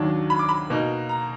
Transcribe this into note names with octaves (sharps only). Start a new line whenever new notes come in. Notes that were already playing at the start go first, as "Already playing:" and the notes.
Already playing: D#2 D#3 F#3 D4
B5
D6
B5
B2 A#3 D#4
A#5